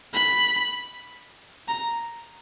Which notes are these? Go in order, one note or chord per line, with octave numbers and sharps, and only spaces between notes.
B5
A#5